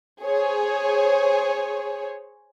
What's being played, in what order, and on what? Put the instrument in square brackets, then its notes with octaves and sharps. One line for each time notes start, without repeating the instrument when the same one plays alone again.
[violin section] G#4 C5 C#5